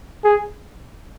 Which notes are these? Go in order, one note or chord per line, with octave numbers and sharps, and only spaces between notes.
G#4